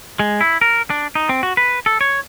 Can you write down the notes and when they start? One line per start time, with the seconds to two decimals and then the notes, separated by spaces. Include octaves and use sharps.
0.19 G#3
0.41 E4
0.61 A#4
0.90 D4
1.15 D#4
1.29 C4
1.43 F#4
1.57 B4
1.86 A4
2.01 C#5